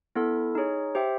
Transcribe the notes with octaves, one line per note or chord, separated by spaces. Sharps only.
B3 E4 A4
D#4 G#4 C#5
G4 C5 E5 G5